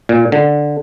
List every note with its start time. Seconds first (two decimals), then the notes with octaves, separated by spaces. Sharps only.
0.09 A#2
0.32 D3